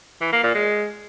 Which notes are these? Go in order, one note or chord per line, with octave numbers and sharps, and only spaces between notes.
E3
A#3
A#2
G#3